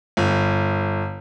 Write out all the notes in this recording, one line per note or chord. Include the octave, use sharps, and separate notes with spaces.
G1